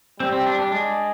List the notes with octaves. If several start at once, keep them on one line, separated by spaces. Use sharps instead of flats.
G3 C4
C4
D4
D4
G#3 D4